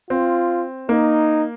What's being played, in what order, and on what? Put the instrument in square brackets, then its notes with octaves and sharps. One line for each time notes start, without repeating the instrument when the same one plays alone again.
[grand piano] C4 [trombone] F4
[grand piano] A#3 [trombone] D#4